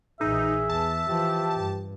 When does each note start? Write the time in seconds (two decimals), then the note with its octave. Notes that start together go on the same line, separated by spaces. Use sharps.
0.21 A#1 E3 D#4 G#4 E5
0.69 E2 A5
1.09 E3 F3 G4
1.54 G2